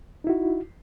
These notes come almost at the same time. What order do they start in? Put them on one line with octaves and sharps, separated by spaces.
D#4 E4 F#4